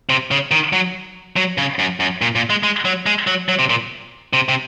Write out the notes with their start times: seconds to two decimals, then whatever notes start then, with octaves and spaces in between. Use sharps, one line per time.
0.10 C3
0.31 C#3
0.51 D#3
0.73 F#3
1.36 F#3
1.58 C#3
1.79 F#2
2.00 F#2
2.22 A#2
2.35 A#2
2.50 G#3
2.63 G#3
2.85 F#3
3.06 G#3
3.27 F#3
3.49 F#3
3.59 C3
3.70 A#2
4.33 C3
4.49 C3